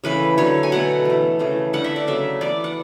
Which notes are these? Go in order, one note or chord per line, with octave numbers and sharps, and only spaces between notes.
C#3 E3 A3 B4
D3 F#3 A3 C#5
G#5
B2 A3 F#5
E3 A3
C#3 E3 A3
D3 A3 F#5
E5
D5
C#3 F#3 A3 E5
E3 B3 D5
F#5